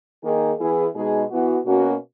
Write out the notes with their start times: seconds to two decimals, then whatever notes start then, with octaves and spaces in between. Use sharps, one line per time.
0.24 D#3 A#3 D#4 G#4
0.59 E3 B3 E4 G#4
0.95 B2 G#3 D#4 G#4
1.31 E3 B3 F#4
1.65 B2 A#3 C#4 F#4